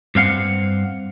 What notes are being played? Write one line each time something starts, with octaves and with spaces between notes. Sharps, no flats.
G2 C4 F5 F#5